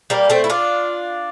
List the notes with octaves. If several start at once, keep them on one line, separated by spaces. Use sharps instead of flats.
G3 A#3
A3 C4
E4
D4 F4